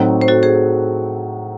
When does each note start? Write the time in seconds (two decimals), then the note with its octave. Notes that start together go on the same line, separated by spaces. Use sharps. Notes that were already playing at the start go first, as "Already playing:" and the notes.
Already playing: A2 F#3 C4 D#4 F#4
0.21 C5
0.28 F#4 A4
0.43 G#4 C5